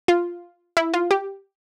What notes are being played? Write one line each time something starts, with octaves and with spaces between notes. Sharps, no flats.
F4
E4
F4
G4